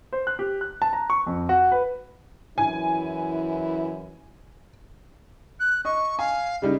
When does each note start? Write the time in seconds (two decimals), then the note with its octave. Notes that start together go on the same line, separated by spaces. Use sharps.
0.13 C5
0.27 F#6
0.39 G4
0.61 F#6
0.82 A5
0.93 A#5
1.10 C#6
1.27 F2
1.49 F#4
1.72 B4
2.58 F#2 E3 E4 G#5
5.60 F#6
5.85 D#5 C#6
6.19 F5 G#5
6.62 C#3 G3 D#4